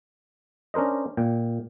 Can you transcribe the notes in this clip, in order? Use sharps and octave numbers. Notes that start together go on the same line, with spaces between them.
C#4 D4 A#4 C5 D#5
A#2 G5